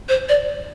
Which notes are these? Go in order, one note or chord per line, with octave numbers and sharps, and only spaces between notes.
C5
D5